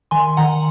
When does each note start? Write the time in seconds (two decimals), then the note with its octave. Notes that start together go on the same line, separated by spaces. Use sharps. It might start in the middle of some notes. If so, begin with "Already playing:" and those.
0.11 D#3 G#5 C6
0.37 D#3 F#5 A#5